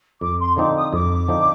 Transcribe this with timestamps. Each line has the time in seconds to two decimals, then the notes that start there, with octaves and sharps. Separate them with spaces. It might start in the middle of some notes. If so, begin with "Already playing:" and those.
0.21 F2 D6
0.39 C6
0.56 D3 F3 C4 D#4 D6
0.75 D#6
0.92 F2 D6
1.28 D3 F3 C4 D#4